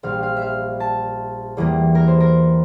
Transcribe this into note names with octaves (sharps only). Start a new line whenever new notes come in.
A#1 A#2 G3 F5
F5
E5
F5
A5
E2 E3 G3 A#3
A#4
C5
A#4